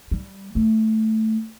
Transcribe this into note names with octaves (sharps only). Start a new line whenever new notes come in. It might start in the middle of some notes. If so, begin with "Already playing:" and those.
G3
A3